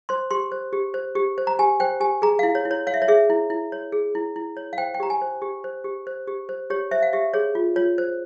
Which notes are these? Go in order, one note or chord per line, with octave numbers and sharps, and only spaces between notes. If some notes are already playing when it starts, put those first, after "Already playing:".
C5 C6
G4 C6
C5
G4
C5
G4
C5
A#5
G4 G#5
C5 G5
G4 G#5
G#4 A#5
E4 F5
C#5
E4
C#5
C#5 F5
E5
C#5
G#4 E5
E4
E4
C#5
G#4
E4
E4
C#5
F5
C5 G5
G5
G4 A#5
G#5
C5
G4
C5
G4
C5
G4
C5
G4 C#5
C5 E5
F5
G4 E5
G#4 C#5
F4
F4 C#5
C5